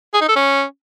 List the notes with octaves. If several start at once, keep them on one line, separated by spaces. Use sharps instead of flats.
G#4
D#4
A4
C#4